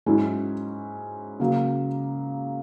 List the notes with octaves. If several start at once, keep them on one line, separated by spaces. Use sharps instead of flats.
G#2 F#3 C#4 E4
C#3 F#3 A#3